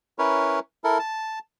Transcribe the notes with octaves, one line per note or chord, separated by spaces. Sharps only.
C#4 E4 A#4 B4 C#5
E4 A4 A#4
A5